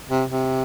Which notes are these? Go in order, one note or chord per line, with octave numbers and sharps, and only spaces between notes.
C3
C3